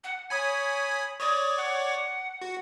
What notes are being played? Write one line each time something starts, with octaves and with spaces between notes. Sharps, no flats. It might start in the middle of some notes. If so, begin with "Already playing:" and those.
F#5
C#5 G#5 B5 D#6
C#5 D5 D#6
F#5
F#4